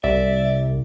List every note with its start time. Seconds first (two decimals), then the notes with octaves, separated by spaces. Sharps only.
0.04 C2 D5 E5